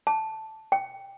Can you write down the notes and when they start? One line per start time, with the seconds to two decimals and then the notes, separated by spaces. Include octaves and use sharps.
0.07 A5
0.72 G5